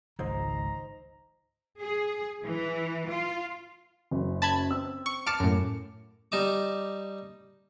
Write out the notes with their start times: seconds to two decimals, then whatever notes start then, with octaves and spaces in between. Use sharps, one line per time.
0.19 G#1 C#2 F3 D#4 C5 A#5 E6
1.79 G#4
2.44 E3
3.09 F4
4.11 F#1 F#2
4.42 A5 B5 G#6
4.70 C4 E6
5.06 C#6
5.26 A5 D6 F6 C#7 D7
5.40 F#2 A2
6.32 G3 D#4 A5 D6